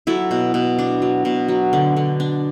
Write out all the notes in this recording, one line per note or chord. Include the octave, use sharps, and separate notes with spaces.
F#3 E4 A4
B2
B2
D4
F#3
B2
F#3
D3
D3
D4